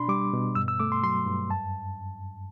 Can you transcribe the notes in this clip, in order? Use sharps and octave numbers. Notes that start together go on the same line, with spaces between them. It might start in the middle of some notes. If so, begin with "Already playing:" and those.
Already playing: B2 D4 B5 C6
G3 D6
B2
G2 E6
E6
A3 D6
C6
F#3 C6
G2
F#2 A5